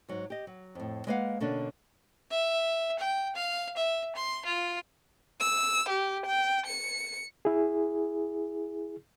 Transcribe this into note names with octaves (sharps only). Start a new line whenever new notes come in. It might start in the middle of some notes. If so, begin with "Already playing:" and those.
G#2 F#3
G4 D#5
F#3
F2 A2
G#3 A#3 B4 D#5 F5 F#5
B2 D3 A#3 C#4 D4
E5
G5
F5
E5
C6
F4
E6
G4
G5
C#7
E4 G#4